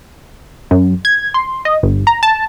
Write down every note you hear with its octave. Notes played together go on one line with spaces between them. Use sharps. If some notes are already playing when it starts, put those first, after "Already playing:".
F#2
G#6
C6
D#5
G1
A#5
A5